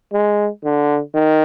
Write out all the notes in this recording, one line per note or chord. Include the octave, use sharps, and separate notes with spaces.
G#3
D3
D#3